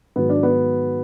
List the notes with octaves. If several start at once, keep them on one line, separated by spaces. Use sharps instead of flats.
G#2 D#3 F#3 B3
D4
B3